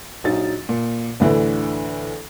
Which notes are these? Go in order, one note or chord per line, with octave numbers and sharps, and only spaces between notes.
A#1 F#3 D#4 A6
A#2
D2 A2 D3 E3